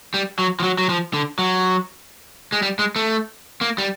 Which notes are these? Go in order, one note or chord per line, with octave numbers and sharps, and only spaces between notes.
G3
F#3
F3
F#3
F#3
F3
D3
F#3
G#3
G3
G#3
A3
A#3
G3